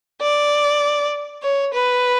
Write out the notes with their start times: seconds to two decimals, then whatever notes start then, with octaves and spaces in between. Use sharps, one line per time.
0.22 D5
1.43 C#5
1.75 B4